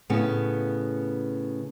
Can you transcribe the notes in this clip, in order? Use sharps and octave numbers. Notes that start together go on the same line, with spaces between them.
A2 C#3 B3